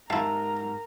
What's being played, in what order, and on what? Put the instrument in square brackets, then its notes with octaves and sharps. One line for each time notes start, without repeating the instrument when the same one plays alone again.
[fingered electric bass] G#2 [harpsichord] E4 F5 [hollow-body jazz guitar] G4 E5 A5 [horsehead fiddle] A#4 A#5